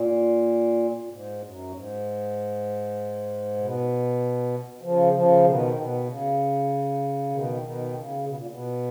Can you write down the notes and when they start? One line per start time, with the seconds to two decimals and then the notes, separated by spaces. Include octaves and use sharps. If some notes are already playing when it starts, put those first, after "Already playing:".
Already playing: A#2
1.00 A#2
1.09 G#2
1.39 F#2
1.71 G#2
3.58 B2
4.82 C#3 F3
5.13 C#3 F3
5.44 B2 D#3
5.75 B2
6.06 C#3
7.30 B2 D#3
7.62 B2 D#3
7.93 C#3
8.24 B2
8.35 A#2
8.47 B2